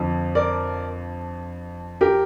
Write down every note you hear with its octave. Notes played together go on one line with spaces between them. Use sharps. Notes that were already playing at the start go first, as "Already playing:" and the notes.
Already playing: F2 D3 F3
A#4 D5
G4 A#4